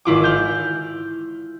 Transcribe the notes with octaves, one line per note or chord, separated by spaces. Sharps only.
G#1 E4 F4 D6
F6 G6